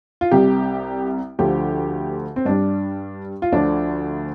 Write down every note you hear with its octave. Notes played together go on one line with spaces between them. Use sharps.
F4
C2 C3 G3 G4
D2 D3 F3 G4
C4
G2 G3 D4
F4
D2 D3 F3 D4